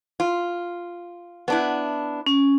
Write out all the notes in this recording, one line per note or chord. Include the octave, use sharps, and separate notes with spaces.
F4
B3 D4 E4
C#4